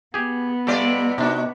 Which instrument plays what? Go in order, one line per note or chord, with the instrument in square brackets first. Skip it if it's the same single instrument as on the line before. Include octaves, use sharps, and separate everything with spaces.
[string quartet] B3 [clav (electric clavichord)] G4 G#4
[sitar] C3 G3 D5 [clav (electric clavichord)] F4 G4 A4
[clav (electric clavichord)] C3 D4 [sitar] D#4 F#4